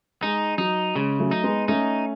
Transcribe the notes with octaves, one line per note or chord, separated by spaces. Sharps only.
G#3 D#4
F#3 D#4
C#3 G#3
F#3 A3
D#4
G#3 B3
A3 C#4 D#4